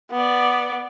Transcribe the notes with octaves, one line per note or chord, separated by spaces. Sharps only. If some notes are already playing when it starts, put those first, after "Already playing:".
B3 D5